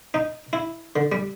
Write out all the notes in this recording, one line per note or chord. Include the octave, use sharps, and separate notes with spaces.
D#4
E4
D3
G3